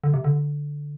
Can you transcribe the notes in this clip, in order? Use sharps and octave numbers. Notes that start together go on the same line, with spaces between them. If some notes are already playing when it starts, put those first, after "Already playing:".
D3
C3
D3